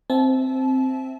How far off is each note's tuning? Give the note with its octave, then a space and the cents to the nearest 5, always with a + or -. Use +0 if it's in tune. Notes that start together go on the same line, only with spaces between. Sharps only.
C4 +0 E5 +0 A5 -30